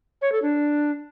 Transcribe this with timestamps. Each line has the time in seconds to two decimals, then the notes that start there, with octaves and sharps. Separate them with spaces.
0.22 C#5
0.32 A4
0.42 D4